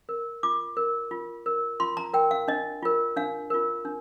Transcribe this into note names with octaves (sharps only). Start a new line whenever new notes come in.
A#4
F4 D6
A#4
F4
A#4
F4 C6
A#5
A#4 G5
F5
D4 D#5
F4 A#4
D4 F5
F4 A#4
D4